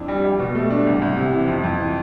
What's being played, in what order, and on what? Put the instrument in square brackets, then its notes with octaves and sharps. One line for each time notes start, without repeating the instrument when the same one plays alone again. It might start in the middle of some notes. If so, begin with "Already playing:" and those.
Already playing: [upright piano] F2 D4 E4
G3
G4
B2
A3
D4
C2
C2
C3
E3
F2
F2
E3